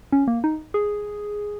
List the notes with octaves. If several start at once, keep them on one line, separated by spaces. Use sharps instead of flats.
C#4
A#3
D#4
G#4